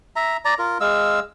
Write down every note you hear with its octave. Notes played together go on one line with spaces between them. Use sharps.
E5 A#5
D5 A#5
F4 A#4
G#3 F5 E6